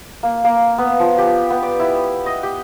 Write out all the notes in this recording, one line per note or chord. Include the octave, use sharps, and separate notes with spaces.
A#3
A#3
B3
F3
G4
B3
D5
E4
D#5
G4